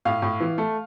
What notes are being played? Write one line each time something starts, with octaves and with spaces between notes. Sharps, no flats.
A2 F5
A2
E3
A3